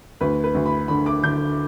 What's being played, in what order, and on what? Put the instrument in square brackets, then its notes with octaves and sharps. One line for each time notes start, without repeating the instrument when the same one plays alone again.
[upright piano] D2 B4
B4
D2
B5
D3 B5
D6
D3 G6